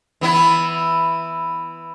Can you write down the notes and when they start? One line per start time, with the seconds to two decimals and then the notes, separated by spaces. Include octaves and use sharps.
0.21 E3 B3 E4